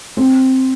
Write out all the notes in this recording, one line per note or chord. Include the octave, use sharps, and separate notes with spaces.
C4